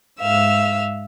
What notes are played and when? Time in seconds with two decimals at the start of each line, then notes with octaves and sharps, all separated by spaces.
0.21 G#2 E5 F5 E6